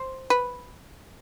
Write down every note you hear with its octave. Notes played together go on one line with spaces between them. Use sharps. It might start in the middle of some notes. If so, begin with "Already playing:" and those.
Already playing: C5
B4